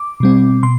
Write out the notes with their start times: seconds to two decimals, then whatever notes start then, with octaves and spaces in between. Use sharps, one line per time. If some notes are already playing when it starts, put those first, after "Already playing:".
Already playing: D6
0.20 B2 G3 C4
0.63 B2 C6